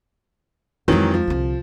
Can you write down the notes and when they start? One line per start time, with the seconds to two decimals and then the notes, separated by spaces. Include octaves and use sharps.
0.88 F2 D#3 E3 F#3 G#3
1.14 F3
1.27 C2 D3